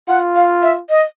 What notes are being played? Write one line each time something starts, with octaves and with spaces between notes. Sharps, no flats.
F4 F#5
F5
E5
D#5